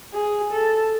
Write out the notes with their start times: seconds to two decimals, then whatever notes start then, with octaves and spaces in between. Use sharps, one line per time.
0.13 G#4
0.52 A4